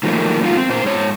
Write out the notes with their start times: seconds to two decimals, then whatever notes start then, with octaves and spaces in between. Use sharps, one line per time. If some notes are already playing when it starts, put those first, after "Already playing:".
0.03 D#3 F3 F#3 A3 A#3
0.42 G#2 G#3 D#4 F4 F5
0.57 C4
0.69 A#2 C5
0.84 G#2 C#5